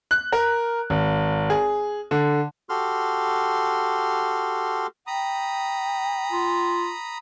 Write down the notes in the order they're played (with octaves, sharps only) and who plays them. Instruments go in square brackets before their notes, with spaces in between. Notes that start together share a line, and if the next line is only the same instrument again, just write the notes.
[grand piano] F#6
A#4
G#1
G#4
D3
[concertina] F#4 G4 A4 C6 F6
[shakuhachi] G5 [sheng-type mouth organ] A#5 B5 D#6
[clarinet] F4